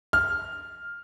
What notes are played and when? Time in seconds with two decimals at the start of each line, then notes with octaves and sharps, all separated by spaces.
0.13 F6